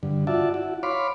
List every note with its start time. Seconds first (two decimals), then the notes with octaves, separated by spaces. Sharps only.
0.03 G2 D3
0.27 F4 F#4 D5 E5 A5
0.54 E4 F#4
0.83 C#5 F5 B5 C6 D6